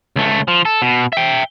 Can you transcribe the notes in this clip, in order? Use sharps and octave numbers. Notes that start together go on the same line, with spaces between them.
C#2 A3
F3
A4
B2
E5 G5